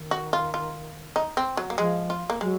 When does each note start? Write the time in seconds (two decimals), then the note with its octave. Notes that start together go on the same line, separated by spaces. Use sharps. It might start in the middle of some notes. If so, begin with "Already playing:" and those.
Already playing: D#3
0.11 F#4
0.33 F4
0.54 F4
1.16 D#4
1.37 C4
1.57 F#3
1.70 A#3
1.78 F3 G#3
2.10 F4
2.30 A#3
2.41 F#3 G#3